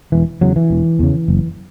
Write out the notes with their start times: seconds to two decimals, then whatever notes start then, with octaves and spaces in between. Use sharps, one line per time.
0.12 E1 E3
0.41 E2 C#3 F#3
0.56 E3
0.70 E1
0.99 E2 C#3
1.28 F#1